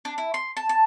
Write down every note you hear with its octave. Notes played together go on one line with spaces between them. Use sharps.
D4
E4
C6
A5
A5